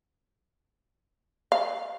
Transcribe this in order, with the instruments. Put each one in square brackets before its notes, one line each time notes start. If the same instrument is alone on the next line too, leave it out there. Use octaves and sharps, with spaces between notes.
[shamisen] F5